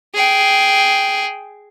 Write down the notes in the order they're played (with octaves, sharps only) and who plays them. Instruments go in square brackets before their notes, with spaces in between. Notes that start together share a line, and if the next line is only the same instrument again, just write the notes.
[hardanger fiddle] G#4 G5